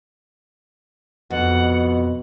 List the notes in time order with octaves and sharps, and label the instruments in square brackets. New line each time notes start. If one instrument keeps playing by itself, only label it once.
[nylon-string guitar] F2 [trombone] B2 [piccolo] F#5